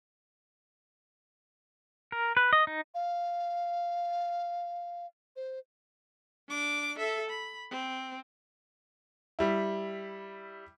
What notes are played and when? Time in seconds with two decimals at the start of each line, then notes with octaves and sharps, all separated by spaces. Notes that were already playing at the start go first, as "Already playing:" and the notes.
2.12 A#4
2.37 B4
2.53 D#5
2.67 D#4
2.94 F5
5.36 C5
6.49 D4 D6
6.98 A4 E5
7.30 B5
7.70 C4
9.39 G3 E4